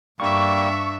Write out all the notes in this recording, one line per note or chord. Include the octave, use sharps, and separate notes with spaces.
G2 G3 A#3 D4 E5 C#6